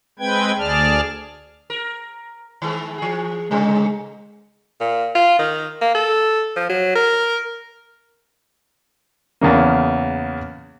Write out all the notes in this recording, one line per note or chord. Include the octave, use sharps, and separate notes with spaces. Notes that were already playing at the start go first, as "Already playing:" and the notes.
G#3 C4 B4 G5 G#6
D2 G#4 D5 A5 F6
A#4
D#3 G#3 B3
E3 G#4
G#2 C3 G#3 A3
A#2
F4
D#3
A#3
A4
F3
F#3
A#4
E2 C#3 A#3